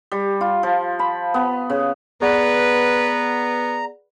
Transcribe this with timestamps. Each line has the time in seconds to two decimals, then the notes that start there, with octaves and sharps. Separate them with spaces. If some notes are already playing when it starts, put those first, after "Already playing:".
0.12 G3
0.41 F4
0.63 F3
0.99 B5
1.34 B3
1.70 C#3
2.22 B3 G#4 B4 D5 F#5 A#5